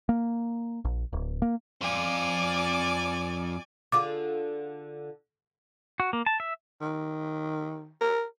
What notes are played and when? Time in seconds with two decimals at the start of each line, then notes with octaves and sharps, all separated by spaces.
0.09 A#3
0.85 A#1
1.13 D1
1.42 A#3
1.82 F2 F4 D5 G#5 D6
3.92 D3 F4 G#4 D6
6.00 F#4
6.13 A#3
6.26 A5
6.40 E5
6.81 D#3
8.01 A#4